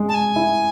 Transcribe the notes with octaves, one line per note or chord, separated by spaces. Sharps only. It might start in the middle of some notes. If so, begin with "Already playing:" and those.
Already playing: G#3
A5
G#5
E4